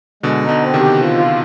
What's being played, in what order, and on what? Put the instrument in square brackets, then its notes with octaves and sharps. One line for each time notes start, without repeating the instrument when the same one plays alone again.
[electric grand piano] B2 D3 [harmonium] G#3
[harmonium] D#4
[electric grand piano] B2 D3
[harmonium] C4
[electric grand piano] C3 D#3
[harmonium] G4
F3
F4